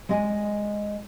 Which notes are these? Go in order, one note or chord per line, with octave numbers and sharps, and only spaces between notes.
G#3 D5 D#5 G#5